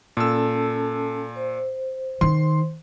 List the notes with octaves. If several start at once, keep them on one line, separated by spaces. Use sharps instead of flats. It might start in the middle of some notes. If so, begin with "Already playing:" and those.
A#2 C#4 A4 A5 E6
C5
D#3 C6